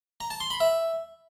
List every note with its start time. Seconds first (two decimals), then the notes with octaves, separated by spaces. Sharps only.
0.21 A#5
0.31 A5
0.40 C6
0.50 B5
0.60 E5